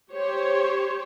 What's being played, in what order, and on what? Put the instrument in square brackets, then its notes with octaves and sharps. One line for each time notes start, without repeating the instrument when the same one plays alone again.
[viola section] G4 C5 C#5